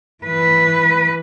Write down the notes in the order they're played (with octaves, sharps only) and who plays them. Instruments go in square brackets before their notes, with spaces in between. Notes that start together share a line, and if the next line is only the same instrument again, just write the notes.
[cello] E3 B4